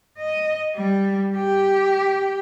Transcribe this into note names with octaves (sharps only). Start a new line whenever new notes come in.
D#5
G3
G4